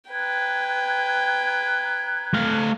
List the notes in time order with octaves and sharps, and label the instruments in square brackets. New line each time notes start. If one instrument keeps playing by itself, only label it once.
[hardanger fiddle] B4 G5 [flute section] A#5 F#6 G#6
[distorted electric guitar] A3 F5